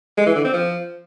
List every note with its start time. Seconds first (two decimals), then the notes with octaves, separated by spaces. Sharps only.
0.17 G#3
0.26 E3
0.35 D3
0.44 C4
0.53 F3